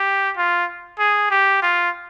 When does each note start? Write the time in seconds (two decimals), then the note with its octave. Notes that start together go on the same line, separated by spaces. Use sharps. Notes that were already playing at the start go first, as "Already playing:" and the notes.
Already playing: G4
0.37 F4
0.99 G#4
1.31 G4
1.62 F4